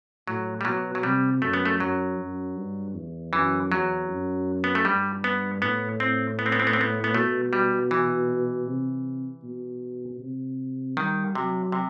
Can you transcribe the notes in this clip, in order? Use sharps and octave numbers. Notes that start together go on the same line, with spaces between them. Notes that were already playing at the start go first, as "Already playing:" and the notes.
A2 F#3
G3
B2 F#3
F#3
C3 G3
F#2 A3
B3
A3
F#2 F#3
F#2
G2
E2
F#2 E3
E2 F#3
F#2
B3
A3
G2 G3
B3
A2 B3
C4
B3
C4
B3
C4
B3
C4
B3
B3
B2 A3
G3
E3
C3
B2
C3
D#3 G3
C3 F#3
C3